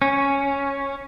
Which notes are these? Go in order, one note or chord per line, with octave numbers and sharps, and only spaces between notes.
C#4